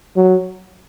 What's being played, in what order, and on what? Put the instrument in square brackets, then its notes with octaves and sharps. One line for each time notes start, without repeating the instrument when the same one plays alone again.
[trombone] F#3